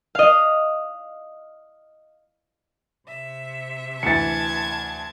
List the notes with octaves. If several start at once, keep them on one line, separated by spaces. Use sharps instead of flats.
D#5 F5
C3 E5
D2 E3 A5 G#6 A6 C#7